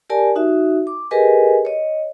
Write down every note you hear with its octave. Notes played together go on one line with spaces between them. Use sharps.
G4 A#4 D5 G#5 A5
D#4 F#4 E5
D6
G4 G#4 A#4 B4 D#5 G#5
C#5 D#5